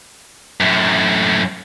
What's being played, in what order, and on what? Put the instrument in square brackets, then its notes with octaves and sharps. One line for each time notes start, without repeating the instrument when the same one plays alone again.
[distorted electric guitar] F#2 A2